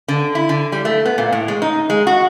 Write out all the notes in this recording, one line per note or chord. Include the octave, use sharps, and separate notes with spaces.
D3
E4
D3
G3
A3
B3
A#2
A2
G#3
D#4
G#3
F#4